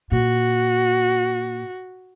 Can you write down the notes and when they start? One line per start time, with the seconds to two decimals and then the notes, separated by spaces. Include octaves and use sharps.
0.12 A#2 F#4